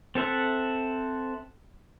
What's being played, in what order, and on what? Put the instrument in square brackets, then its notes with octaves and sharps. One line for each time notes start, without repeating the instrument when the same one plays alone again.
[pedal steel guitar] C4 A4 E5 F#5